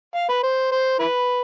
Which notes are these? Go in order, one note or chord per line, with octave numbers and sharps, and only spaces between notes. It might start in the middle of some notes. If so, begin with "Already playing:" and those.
F5
B4
C5
C5
E4 B4